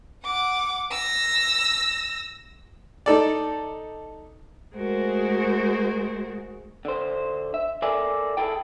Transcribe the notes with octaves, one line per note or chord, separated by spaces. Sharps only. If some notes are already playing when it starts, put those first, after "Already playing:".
F#5 D6
E6 A#6
D#4 A4 D5
G#3 A3 F#4 G#4 A#4 C5
D3 C5
E5
A4 A#4 D5 E5 G#5
E4 G#4 A4 G5